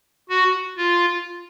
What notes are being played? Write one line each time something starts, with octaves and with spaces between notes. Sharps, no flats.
F#4
F4